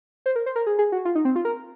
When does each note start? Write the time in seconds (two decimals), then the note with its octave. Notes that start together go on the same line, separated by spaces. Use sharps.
0.26 C5
0.36 A#4
0.46 C5
0.56 A#4
0.67 G#4
0.79 G#4
0.92 F#4
1.05 F4
1.15 D#4
1.25 C4
1.36 F4
1.45 A#4